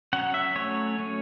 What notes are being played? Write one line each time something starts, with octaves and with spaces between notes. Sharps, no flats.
F#3 C#4 F#5
E5
F#3 A3 C#4 C#5
F#3 A3 C#4